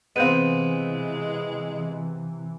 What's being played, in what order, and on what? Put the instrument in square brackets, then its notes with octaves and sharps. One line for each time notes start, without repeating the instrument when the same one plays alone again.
[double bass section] C3 E3 [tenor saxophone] G#3 [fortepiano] B3 C4 [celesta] F5 G6 D#7